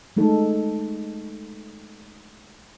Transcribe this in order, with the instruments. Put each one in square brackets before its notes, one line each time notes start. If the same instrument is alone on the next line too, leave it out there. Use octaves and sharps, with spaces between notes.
[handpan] G#3 A3 D#4 A4